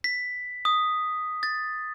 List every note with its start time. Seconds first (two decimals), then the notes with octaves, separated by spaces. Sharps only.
0.04 B6
0.65 D#6
1.43 A6